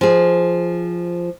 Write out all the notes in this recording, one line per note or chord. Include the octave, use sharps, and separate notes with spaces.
F3 G#4